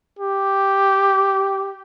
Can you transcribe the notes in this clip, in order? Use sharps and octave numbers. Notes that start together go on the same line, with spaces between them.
G4